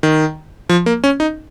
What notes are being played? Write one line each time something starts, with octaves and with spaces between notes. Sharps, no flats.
D#3
F3
A#3
C#4
D#4